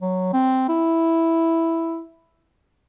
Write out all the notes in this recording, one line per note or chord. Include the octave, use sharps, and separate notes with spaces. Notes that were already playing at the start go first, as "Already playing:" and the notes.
F#3
C4
E4